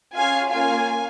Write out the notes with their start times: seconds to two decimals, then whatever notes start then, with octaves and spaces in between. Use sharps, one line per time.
0.15 C#4 F4 G#4 F5 G#5
0.51 A#3 C#4 F4 F5 G#5